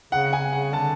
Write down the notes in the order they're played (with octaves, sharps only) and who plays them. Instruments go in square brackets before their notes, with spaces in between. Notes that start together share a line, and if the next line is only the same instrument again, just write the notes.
[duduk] C#3 [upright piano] F#5
[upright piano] G#5
[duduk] C#3 [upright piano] F#5
[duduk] D3 [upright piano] A5